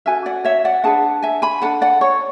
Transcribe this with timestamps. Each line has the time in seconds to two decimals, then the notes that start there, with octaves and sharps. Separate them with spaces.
0.06 C#4 F#4 A4 E5 G#5
0.26 D5 F#5
0.45 C#5 E5
0.65 D5 F#5
0.84 D4 G#4 B4 F#5 A5
1.22 E5 G#5
1.42 G#5 B5
1.62 D4 A4 F#5 A5
1.81 D5 F#5
2.01 C#5